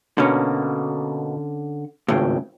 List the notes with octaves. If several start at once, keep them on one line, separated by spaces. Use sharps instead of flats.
B2 D3 A#3 C#4 A#5
G#1 C#2 A2 C#3 G5